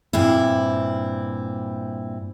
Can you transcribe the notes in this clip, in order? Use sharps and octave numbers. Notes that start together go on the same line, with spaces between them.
G2 A#2 C4 E4